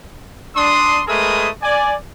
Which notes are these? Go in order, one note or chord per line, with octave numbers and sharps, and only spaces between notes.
D4 C6 D#6
G#3 A3 G#4 A#4 B4 D#6
D5 G#5